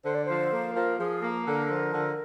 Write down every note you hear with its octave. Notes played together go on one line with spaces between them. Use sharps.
D3 C5
D5
F3 C5
A#3
F3 A#4
F3 G#4
A#3 A#4
D3 A#4
F3
D3